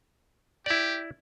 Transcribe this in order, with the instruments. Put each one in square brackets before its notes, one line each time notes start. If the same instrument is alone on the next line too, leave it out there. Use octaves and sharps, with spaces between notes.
[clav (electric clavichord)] E4 D5 [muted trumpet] G4